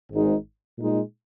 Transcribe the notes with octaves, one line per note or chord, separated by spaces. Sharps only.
G#1 G#2 G#3 D#4
A#2 G#3 D#4